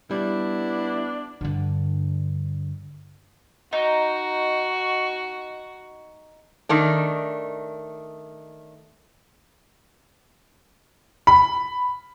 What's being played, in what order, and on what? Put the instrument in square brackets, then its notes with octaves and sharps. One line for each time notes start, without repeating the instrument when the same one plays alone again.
[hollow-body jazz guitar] G3 [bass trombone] B3 [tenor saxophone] D4 [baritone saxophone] E4
[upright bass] G2 D3
[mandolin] D#4 [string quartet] F#4
[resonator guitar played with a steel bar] D#3 A3 D4
[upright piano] B5